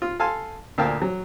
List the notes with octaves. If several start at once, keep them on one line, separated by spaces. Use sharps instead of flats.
F4
A4 F5 G#5 A5 C6
D2 A#2 A#4 F5 G5 A5
F#3